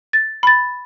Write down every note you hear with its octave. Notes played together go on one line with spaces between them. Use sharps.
A6
B5 A6